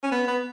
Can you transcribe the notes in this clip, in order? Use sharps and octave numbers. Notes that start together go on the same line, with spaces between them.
C#4
B3
B3